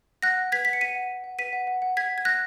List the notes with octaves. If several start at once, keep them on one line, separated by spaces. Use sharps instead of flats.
F#5 F#6 A#6
F#5
B4 G#6 B6
F#5 B6
C#7
F#5 B6 D#7
F#5
F#5
F#5
B4 B6 D#7
F#5
F#5
F#5
F#5 G#6 B6
F#5
G#6
F#5 F#6 A#6